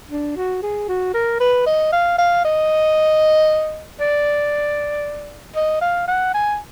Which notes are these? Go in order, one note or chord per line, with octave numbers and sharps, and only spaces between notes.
D4
F#4
G#4
F#4
A#4
B4
D#5
F5
F5
D#5
D5
D#5
F5
F#5
G#5